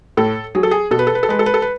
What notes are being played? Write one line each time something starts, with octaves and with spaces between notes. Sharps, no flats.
A2 A4
F#3 G#4
A4
G#4
B2 A4
B4
A4
B4
A4
G#3 B4
A4
B4
A4
B4